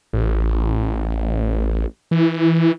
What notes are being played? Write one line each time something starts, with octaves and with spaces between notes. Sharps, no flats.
A1
E3